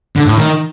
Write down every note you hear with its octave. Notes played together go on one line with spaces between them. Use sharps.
D3
A2
D#3